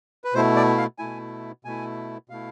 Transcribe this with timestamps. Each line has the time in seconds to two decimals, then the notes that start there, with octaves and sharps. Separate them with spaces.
0.24 B4
0.34 B2 A3 E4 C5
0.56 D5
0.78 F5
0.99 B2 A3 E4 G#5
1.65 B2 A3 E4 G#5
2.29 B2 A3 E4 F5